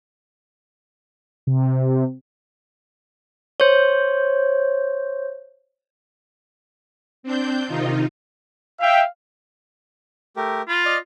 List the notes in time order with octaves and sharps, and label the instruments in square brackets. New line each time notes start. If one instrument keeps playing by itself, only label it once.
[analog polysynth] C3
[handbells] C5 C#5
[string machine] C4 D4 G6
C3 D#3 D#4 F4
[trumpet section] E5 G5 [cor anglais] F5
[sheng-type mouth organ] A3 G4 A#4
[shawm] F4 [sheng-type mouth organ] B5
[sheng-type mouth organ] D5 D#5 F6